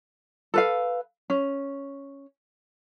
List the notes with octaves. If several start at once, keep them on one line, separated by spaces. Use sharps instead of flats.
A4 B4 F5
C#4